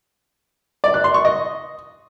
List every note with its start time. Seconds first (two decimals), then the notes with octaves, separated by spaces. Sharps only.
0.84 D5
0.94 F#6
1.04 C6
1.14 C#6
1.25 D#5